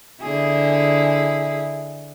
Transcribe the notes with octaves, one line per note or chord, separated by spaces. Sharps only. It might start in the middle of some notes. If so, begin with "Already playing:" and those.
D3 E4 G#4